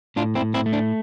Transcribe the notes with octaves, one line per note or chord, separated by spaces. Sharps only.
A2 D4 F4
C4 E4
A2
C4 E4
A3
D4